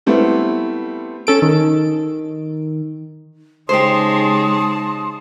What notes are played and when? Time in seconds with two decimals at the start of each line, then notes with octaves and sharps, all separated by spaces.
0.06 G3 A3 B3 C4 E4 G4
1.27 C#4 A4 D7
1.42 D#3
3.69 C#3 G#3 D#4 G4 C5 A5 C6 D#6